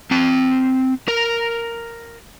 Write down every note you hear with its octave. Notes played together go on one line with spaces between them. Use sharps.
C4 A5
A#4